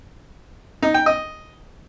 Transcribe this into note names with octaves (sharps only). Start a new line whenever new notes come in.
D#4
G5
D#5